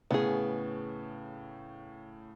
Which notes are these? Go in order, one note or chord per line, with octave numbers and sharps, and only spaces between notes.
A2 C#3 B3 G#4